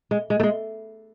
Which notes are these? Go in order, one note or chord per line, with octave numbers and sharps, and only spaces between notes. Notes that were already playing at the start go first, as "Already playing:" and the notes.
G#3
G#3
A3
G#3